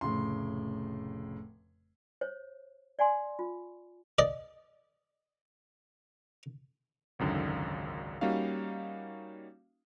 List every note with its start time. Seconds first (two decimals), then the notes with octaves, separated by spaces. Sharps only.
0.01 F1 A2 C#3 C6
2.21 C5 C#5
2.99 D5 F#5 G#5 C6
3.39 F4
4.19 D5 D#5
7.19 G#1 C#2 F#2 D3 D#3
8.21 G3 A#3 C#4 D#4 F#4 F5